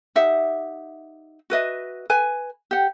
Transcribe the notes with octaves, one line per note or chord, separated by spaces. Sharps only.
D#4 G4 E5 F#5
F#4 B4 D#5 E5
B4 G#5
G4 F#5